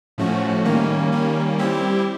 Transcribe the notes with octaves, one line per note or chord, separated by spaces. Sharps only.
A2 F3 A3 C#4 F#4
D#3 G3 A#3 C#4
D#3 G3 A#3 C#4
G3 C4 E4 G4